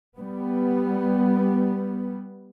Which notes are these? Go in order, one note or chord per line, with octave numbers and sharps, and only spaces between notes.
G3 B3